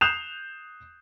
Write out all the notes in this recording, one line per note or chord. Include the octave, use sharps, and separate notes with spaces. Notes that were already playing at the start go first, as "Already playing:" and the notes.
D#6 F#6 G6 C7 E7 F7